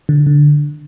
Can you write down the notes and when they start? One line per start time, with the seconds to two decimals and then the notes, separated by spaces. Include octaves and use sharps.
0.09 D3
0.27 D3